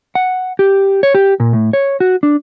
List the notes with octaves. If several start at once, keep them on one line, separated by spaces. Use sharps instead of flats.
F#5
G4
C#5
G4
A#2
A2
C#5
F#4
D4